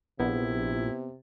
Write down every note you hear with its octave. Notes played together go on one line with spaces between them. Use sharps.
A#1 C3 B3 E4